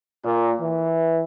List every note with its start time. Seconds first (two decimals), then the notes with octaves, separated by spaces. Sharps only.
0.25 A#2
0.61 E3